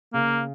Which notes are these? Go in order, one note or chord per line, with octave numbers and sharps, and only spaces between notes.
C#3 A#3